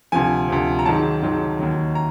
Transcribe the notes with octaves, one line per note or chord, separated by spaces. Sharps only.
D2 C3 F3 G#5
D2 C3 F3
A#5
G#2 D#3 F#3 A5
G#2 D#3 F#3
D#2 D#3 F#3
A#5